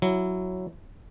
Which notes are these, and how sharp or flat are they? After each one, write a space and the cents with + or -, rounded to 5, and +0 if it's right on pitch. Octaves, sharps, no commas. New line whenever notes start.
F#3 +0 E4 +0